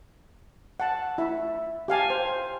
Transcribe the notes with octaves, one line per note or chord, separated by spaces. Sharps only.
F#5 A5
E4 E5
G4 F5 G#5 A5
C5